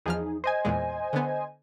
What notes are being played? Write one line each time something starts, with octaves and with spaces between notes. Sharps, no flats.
E2 F3 D#4 G#4 F6
C5 D#5 G#5
E2 A#2 G#3
D3 B3